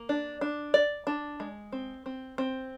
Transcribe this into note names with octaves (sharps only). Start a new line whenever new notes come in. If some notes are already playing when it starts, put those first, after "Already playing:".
Already playing: A#3
D4
D4
D5
D4
G#3
C4
C4
C4